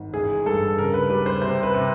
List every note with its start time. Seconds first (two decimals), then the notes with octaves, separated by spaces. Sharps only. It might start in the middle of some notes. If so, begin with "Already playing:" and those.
Already playing: G#1
0.13 A1 G#4
0.46 G2 A4
0.78 C#3 A#4
0.94 B4
1.10 G3 B4
1.26 C5
1.42 C3 C5
1.63 B4
1.74 C3